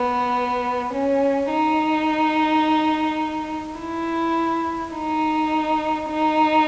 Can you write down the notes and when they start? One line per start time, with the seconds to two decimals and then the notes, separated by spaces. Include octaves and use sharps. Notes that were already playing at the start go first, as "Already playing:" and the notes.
Already playing: B3
0.93 C#4
1.50 D#4
3.79 E4
4.95 D#4
6.09 D#4